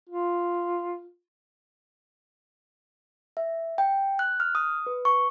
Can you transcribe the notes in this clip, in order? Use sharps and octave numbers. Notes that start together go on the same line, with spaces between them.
F4
E5
G5
F#6
F6
D#6
B4
C#6